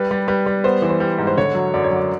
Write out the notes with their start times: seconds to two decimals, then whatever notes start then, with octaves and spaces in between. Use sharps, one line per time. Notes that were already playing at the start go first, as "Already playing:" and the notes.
Already playing: G3 B4
0.11 G3
0.28 G3 B4
0.46 G3
0.64 B3 C5
0.82 E3
0.89 C5
1.00 G3
1.18 G#2
1.27 C5
1.37 D3 C#5
1.55 F#3
1.74 F#2 D5
1.84 C#5
1.91 F#2 D5